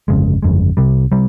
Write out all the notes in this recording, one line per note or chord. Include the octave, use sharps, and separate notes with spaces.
G1 F2 C#3 G#3
G1 F2 C#3 G#3
C2 C3 G3
C3 G3